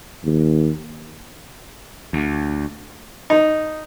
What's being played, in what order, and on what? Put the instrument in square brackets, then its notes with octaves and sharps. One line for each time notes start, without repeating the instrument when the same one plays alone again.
[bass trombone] D#2
[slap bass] D2
[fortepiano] D#4